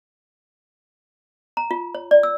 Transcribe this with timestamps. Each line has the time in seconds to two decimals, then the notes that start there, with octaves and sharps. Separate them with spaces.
1.57 A#5
1.71 F4
1.95 C#5
2.11 D5
2.23 E6